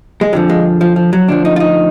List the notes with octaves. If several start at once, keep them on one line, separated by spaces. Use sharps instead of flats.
G#3
F2 D3 F3 F#3
G#3
F3
F3
F#3
D2 D3 F3 D4
D#4
F4
D#4